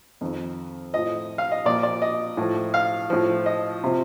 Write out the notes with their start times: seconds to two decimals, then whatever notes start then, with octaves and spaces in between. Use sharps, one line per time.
0.21 F2 D#3
0.93 A2 F3 D#5
1.38 F5
1.52 D#5
1.65 A#2 F3 D5
1.83 D5
2.02 D#5
2.37 A2 F3
2.74 F5
3.10 A2 F3
3.46 D#5
3.84 C3 F3